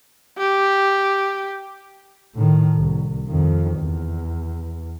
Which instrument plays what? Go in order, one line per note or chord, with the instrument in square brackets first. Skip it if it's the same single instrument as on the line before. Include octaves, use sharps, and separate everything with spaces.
[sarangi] G4
[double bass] A2 D#3
C2
F2 D#3
E2